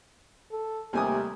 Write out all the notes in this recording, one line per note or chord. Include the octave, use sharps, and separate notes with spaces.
A4
D#2 C3 G3 A3 A#4 G#5 D#6